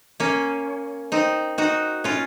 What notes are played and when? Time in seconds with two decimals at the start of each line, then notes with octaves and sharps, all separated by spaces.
0.20 A#3 C#4
1.12 C4 D#4
1.58 D#4 F#4
2.04 C#4 F4